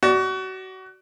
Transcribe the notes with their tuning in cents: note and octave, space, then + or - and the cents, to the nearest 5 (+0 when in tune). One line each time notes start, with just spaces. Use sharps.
F#4 +30 D5 +0